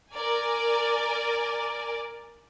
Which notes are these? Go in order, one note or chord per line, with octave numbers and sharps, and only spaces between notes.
A#4 D5 G#5